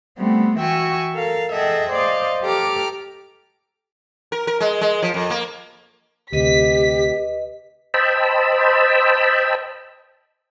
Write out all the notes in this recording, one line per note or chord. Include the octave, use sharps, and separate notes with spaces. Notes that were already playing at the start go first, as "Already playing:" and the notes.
G3 A3 B3 C4
E3 F#4 E5 G5 G#5 C#6
A4 A#4 F5
G#4 A4 D#5 E5 F#5 G5
C5 D5 D#5 F5
G4 A4 A#5 D6 F6
A#4
A#4
G#3
G#3
F3
F2
A#3
D2 C3 G4 B4 D#5 B6
C5 D#5 G5 A5 B5 E6